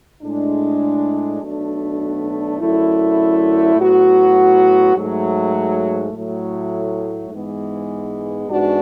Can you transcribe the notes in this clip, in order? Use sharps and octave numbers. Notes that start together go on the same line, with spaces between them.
A2 G#3 D4
B1 B2 A3 D4
F#2 D3 A3 E4
A2 F#3 B3 F#4
G#2 F#3 A3
A2 F#3 A3
G#2 E3 G#3 B3
G#2 E3 B3 D4 F#4